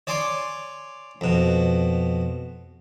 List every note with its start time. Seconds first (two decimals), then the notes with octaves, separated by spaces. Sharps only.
0.07 C#5 D5 G#5 C6 D6
1.21 F2 B2